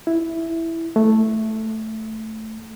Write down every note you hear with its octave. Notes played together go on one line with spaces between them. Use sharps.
E4
A3